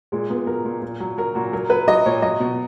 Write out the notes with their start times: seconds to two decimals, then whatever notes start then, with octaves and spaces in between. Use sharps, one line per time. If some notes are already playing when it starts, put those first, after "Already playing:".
0.12 A#2 G#3
0.30 A#2 B3
0.47 F#3 A#4
0.65 A#2
0.82 A#2
1.00 F#3
1.18 F#3 A#4
1.35 A#2 F#4
1.53 F#3 A#4
1.70 F#3 B4
1.88 F#3 D#5
2.06 A#2 C#5
2.22 F#3 D#5
2.40 B2